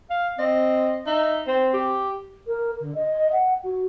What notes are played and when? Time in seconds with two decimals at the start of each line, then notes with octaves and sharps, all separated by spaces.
0.10 F5
0.39 C4 D#5
1.07 D#4 E5
1.47 C4 C5
1.74 G4
2.47 A#4
2.80 D3
2.95 D#5
3.32 F#5
3.64 F#4